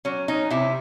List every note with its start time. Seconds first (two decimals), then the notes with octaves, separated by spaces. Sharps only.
0.05 F#3 C#4
0.28 C#4 D#4
0.50 C3 E4